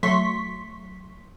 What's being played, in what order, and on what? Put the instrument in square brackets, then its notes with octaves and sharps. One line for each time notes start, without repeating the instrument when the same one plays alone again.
[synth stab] F#3 A3 C6 C#6 B6